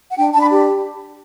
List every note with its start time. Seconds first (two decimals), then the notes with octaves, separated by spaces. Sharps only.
0.10 F#5
0.18 D4 G5
0.34 D4 A5
0.40 B5
0.51 G4